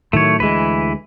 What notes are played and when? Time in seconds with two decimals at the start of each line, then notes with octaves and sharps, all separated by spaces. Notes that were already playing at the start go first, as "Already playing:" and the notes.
0.13 A2 D#3 F#3 A3 C#5
0.40 D2 E3 G#3 B4